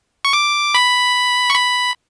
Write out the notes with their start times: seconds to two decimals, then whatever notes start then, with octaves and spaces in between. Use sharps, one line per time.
0.25 C#6
0.33 D6
0.74 B5
1.50 C#6
1.55 B5